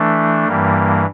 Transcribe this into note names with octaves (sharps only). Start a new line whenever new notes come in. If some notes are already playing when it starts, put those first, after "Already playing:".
Already playing: E3 A3 D4
G2 E3 G3 A#3